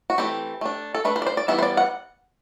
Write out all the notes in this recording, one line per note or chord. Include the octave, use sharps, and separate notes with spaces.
F#4
E3 A3 C4 G4
A3 D4
A4
A3 D4 B4
C5
D5
C5
D5
E3 G3 B3 E5
C5
D5
F#5